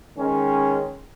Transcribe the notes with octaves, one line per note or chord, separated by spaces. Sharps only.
D#3 G#3 C#4